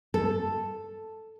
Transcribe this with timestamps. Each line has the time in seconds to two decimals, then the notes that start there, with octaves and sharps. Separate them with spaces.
0.14 A4